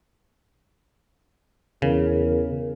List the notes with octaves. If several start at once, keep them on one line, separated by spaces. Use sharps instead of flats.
E2 C#3 A#4